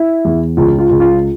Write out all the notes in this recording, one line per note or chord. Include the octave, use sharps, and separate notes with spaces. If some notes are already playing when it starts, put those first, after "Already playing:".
Already playing: E4
E2
C#2 F4
F4
C#2
F4